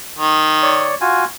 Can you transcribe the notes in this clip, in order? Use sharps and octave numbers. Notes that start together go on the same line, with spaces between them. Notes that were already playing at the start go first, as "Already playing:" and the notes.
D#3
C#5 D5
F4 F#4 G#5